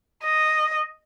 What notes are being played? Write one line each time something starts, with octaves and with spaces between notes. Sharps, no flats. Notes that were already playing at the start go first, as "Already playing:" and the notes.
D#5